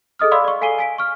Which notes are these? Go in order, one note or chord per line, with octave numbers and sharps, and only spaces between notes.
G#4 A4 D#5 D#6 F6
D5 F5 B5 C6 D6 E6
D5 C#6
A4 F5 G#5 C7 D#7 G7
G#5 B6 D7
C#6 F6